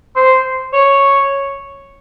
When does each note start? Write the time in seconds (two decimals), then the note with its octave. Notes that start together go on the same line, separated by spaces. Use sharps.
0.16 C5
0.73 C#5